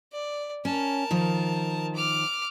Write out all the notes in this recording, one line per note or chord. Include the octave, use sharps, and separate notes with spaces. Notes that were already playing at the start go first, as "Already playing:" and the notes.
D5
C#4 A#4 A5
D#3 F3
D6 F6